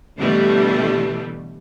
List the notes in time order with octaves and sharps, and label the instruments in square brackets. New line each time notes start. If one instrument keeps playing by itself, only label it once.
[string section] B2 D3 E3 G3 A3